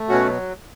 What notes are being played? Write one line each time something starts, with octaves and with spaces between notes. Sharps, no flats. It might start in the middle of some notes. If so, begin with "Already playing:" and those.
Already playing: A3
B2 C#4 F#4
F#3